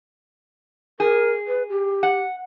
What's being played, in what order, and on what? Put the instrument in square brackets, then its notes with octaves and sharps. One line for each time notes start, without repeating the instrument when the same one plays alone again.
[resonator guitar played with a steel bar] G#4 [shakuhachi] A#4
[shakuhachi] B4
G4
[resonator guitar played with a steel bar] F#5